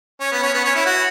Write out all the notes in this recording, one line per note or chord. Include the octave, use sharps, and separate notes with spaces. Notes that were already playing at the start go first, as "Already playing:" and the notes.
C#4
B3
C#4
B3
C#4
E4
F#4